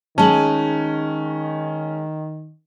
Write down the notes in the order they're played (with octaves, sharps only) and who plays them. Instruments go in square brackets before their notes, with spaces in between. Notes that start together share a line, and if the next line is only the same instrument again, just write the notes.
[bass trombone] D#3 [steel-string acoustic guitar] G#3 D#4 [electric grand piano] C#4 [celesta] A5 F#7